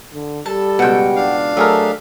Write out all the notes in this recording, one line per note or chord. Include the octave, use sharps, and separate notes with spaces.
D3
G3 A4 A5
C#2 B2 F#4 G5
D4 F5
F#3 A3 G#4 A#4 D#5 E5